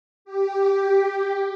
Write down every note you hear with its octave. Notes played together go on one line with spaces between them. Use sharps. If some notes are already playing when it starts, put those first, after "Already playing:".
G4